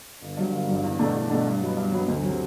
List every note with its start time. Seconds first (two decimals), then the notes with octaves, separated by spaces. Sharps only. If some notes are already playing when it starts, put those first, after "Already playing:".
0.22 G1
0.37 G2 F#3
0.52 G1
0.68 G2 F#3
0.84 E2
0.99 B2 A3 D4
1.15 E2
1.30 B2 A3 D4
1.46 G2
1.61 F#3 B3
1.77 G2
1.92 F#3 B3
2.08 D2
2.23 C3 F#3